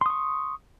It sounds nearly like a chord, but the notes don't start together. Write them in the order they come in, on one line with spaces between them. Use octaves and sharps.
C6 D#6 C#6